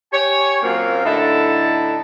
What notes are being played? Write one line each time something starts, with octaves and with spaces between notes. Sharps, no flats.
G4 C#5 G#5
A#2 F#3 A#3 C4 C#4 F4
A2 D3 D#4 E4 A4 A5